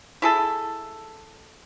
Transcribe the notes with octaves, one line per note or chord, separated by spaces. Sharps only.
E4 G#4 A4